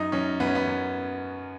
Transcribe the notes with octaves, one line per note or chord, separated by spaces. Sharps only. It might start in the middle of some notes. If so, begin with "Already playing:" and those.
Already playing: F#2 D#4
F#2 C#4
F#2 B3
C#4
B3
F#2